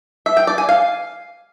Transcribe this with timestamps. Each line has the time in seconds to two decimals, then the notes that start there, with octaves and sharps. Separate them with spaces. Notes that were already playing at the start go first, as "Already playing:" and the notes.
0.26 E5
0.37 G5
0.47 D5
0.58 G#5
0.69 F5